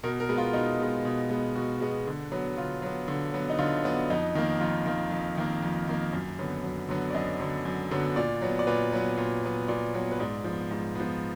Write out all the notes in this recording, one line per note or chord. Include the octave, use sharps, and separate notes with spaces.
B2 A#4
A#4
G#3 B3
F4
B2 D#4
G#3 B3
B2
G#3 B3
B2 F#4
G#3 B3
D3
F#3 B3
D3 F4
F#3 B3
D3
F#3 B3
D#4
D3 F4
F#3 B3
F2 D#4
D#3 A#3
F2 F4
D#3 A#3
F2
D#3 A#3
F2
D#3 A#3
F#2
D3 F#3 B3
F#2
D3 F#3 B3
D5
F#2 D#5
D3 F#3 B3
F#2
D3 F#3 B3
A#2 D5
F#3 B3
D5
A#2 B4
F#3 B3
A#2
F#3 B3
A#2 D5
F#3 B3
B4
G#2 D5
F3 B3
G#2
F3 B3